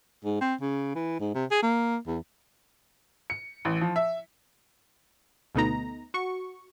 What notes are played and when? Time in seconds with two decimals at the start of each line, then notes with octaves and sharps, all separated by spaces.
0.25 G#2
0.41 C4
0.61 C#3
0.95 E3
1.20 G#2
1.35 C3
1.51 G#4
1.63 A#3
2.07 E2
3.30 C#7
3.65 A1
3.81 F3
3.96 E5
5.55 D2 B2 A3 B3 D#4 A#5
6.14 F#4 C#6